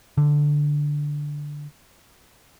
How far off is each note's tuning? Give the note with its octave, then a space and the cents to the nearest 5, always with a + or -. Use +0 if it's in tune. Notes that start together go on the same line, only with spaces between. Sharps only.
D3 +0